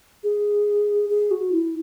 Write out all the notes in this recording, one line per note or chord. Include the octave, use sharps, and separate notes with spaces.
G#4
G#4
F#4
E4